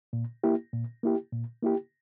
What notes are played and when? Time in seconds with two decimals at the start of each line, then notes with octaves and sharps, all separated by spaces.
0.13 A#2
0.44 A#3 E4 G4
0.73 A#2
1.03 A#3 E4 G4
1.33 A#2
1.63 A#3 E4 G4